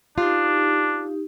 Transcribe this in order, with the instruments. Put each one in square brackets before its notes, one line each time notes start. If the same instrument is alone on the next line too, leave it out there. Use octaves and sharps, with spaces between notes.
[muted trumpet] D4 [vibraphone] D#4 G4 [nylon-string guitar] F4